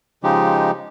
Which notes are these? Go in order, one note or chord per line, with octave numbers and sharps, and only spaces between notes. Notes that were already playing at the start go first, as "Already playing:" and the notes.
C#3 F3 G#3 D#4 G4